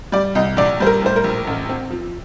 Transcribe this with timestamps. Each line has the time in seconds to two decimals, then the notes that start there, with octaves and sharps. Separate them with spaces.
0.12 G3 D5
0.35 C2 D#5
0.57 A#1 D5
0.80 G3 C5
0.87 A#4
1.02 A2 C5
1.16 A#4
1.24 A#1
1.47 A1
1.69 C4
1.90 F3